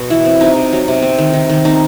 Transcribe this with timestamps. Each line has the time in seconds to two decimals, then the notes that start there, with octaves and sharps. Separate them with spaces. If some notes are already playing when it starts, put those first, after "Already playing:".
Already playing: B2 F#4
0.10 E3 E4
0.25 C4
0.41 C3 D#4
0.57 C3
0.73 F#3
0.88 C3
1.02 C4
1.18 D#3
1.33 D#3
1.50 D#3
1.65 C4 D#4